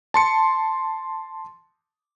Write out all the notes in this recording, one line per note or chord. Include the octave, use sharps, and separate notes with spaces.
A5 C6 C#7